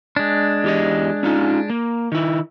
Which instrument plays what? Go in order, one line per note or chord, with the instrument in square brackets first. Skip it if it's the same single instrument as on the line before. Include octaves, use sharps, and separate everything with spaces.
[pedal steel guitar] G#3 D4
[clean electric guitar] E2 G4 D#5
C#4 D#4 F4
A#3
D#3 E4